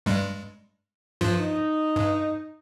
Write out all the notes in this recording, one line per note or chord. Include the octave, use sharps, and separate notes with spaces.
G2 G3 G#3
G2 F3 F4
D#4
G2